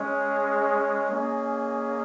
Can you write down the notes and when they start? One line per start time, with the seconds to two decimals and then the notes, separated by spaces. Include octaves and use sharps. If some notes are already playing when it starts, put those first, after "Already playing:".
Already playing: G#3 C#4 G#4 D#5
1.11 A#3 C#4 G#4 D#5